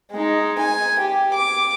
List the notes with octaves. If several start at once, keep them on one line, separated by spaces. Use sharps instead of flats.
G#3 D#4
G#5
G4
D6